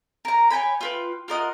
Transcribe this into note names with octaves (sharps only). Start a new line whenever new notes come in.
A#4 A#5
C#5 G5 G#5 B5
F4 B4 G5
F4 A#4 D#5 F#5